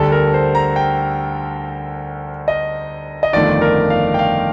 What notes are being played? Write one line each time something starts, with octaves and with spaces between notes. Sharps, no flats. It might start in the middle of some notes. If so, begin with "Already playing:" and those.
Already playing: D2 D3 G3 A4
A#4
C5
A#5
G5
D#5
D#5
G1 F2 D#3 A3 D5
A#4
F5
G5
F5